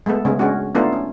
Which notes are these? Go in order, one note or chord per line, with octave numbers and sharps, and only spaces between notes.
G#3 A3 B3 A4
C#3 G#3 A3 B3 C#4
G#3 C#4 D4 F#4
A3 B3 D4 D#4 F4 A4
C#4